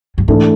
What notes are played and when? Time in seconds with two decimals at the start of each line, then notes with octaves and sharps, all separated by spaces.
0.18 G2
0.28 G#2 E3 A3 D4